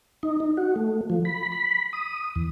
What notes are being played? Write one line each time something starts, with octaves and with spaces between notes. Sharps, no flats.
D#4
D#4
F#4
A3
F3
B5
B5
D#6
E2